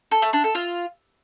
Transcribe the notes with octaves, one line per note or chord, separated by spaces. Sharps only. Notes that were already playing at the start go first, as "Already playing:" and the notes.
A4
A3
D4
A4
F4